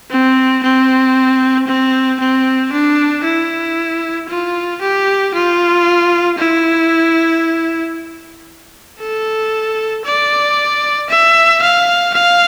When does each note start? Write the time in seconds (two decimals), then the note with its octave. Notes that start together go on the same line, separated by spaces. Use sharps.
0.10 C4
0.63 C4
1.67 C4
2.20 C4
2.72 D4
3.24 E4
4.29 F4
4.81 G4
5.34 F4
6.38 E4
9.00 A4
10.05 D5
11.09 E5
11.62 F5
12.14 F5